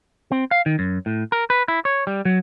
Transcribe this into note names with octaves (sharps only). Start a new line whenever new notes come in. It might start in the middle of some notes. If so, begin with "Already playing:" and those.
C4
F5
D#3
F#2
A2
A#4
B4
E4
C#5
G3
F#3